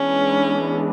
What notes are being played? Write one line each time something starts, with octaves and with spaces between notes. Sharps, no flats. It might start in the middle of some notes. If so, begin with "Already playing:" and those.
Already playing: E3 G#3 B3 C#4 D4